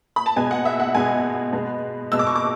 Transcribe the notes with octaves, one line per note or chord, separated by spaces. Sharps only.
B5
A5
B2 G#3 B3 G#5
F#5
E5
F#5
B2 G#3 B3 G#5
B2 G#3 B3
B2 G#3 B3 E6
D6
C#6
D6